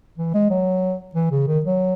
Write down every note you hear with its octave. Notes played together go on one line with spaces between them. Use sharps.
E3
G#3
F#3
E3
C#3
D#3
F#3